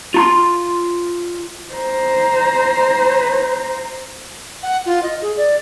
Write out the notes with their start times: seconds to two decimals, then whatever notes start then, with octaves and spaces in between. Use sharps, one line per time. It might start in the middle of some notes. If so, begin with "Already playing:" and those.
0.14 F4 A#5 C6
1.74 C5 A#5
4.63 F#5
4.86 F4
5.03 D#5
5.22 G#4
5.37 D5